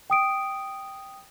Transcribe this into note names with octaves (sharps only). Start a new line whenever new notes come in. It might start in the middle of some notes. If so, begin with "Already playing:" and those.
G5 D#6 D7